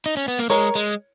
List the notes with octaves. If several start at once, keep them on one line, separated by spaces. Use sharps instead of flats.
D#4
C#4
B3
A#3
G#3 A#4 C#5
G#3